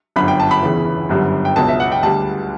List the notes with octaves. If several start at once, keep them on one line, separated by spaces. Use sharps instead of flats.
G1 F#2 D3 B5
G5
A5
B5
E2 C#3 E3
G1 F#2 D3 G3
G5
C#2 B2 F#3 A5
E5
F#5
G5
D2 D3 G3 A5